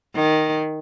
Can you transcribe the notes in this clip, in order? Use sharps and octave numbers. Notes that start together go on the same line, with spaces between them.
D#3